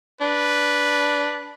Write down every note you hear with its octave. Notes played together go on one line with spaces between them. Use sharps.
D4 B4